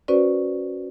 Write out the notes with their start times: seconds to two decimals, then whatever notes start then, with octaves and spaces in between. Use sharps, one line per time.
0.08 C#4 F#4 B4 C5 D5